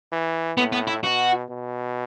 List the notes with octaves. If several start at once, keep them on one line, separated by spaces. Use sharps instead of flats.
E3
A2 B3
B3
E4
B2 F#4
B2